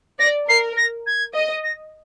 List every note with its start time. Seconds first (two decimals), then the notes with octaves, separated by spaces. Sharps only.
0.19 D5 A#6
0.48 A#4 C7
0.77 A#6
1.06 G#6
1.34 D#5
1.63 A#6